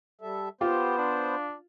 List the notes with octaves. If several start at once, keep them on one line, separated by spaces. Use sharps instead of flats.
G3 A4 E5
B3 F4 G4 C5
D4